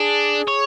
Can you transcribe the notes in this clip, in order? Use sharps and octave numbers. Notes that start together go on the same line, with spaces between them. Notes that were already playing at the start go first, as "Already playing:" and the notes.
Already playing: D4 G#4
C#5